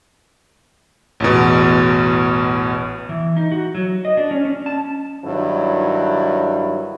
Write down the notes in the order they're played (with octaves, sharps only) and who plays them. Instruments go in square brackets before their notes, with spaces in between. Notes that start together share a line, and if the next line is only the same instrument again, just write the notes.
[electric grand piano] A1 E2 B2
[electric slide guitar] E3
D#4
F#4
F#3
D#5
D4
C#4
C#4
A5
[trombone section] G2 D#3 F#3 E4